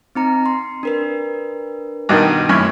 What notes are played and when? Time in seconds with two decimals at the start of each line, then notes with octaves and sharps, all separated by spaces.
0.15 C4 D#4 A#5
0.46 C6
0.83 D4 A#4 B4
2.09 G2 B2 D#3
2.49 F#2 A3 A#3 C#4 E4